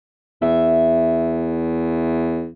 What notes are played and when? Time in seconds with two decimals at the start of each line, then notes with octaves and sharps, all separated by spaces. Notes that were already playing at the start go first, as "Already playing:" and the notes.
0.42 E2 E5